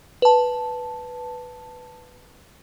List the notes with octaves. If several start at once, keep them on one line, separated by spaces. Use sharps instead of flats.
B4 A5